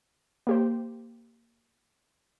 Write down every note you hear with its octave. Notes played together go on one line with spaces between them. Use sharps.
A#3 G4 C5